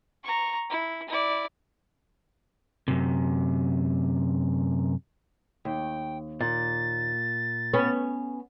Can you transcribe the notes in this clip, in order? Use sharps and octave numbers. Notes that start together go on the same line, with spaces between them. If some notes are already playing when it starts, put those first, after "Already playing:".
A#5 C#6
E4
E4 D5
F#2 C3
D#2 G5
A#2 A6
B3 C#4